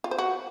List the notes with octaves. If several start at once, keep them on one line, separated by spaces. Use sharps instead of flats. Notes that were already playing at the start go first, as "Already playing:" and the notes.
F4
C5
F#4